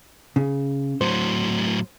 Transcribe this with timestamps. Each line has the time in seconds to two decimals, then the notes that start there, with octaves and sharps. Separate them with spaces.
0.36 C#3
1.01 A2 F#3 C5